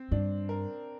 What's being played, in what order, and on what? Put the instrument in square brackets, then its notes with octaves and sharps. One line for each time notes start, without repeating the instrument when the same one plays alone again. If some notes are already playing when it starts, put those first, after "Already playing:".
Already playing: [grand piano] C4
[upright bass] G2 [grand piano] D4
[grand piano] A#4